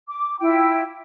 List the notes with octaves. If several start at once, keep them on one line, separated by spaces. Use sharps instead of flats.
D6
E4 F4 G5